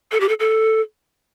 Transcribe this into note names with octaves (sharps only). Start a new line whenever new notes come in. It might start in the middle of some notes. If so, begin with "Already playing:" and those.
A4
G4
A4
A4